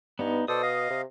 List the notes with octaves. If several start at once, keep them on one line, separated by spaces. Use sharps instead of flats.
G2 B3 D#4
B2 A4 C5 D5 D#6
D#5 F5
C3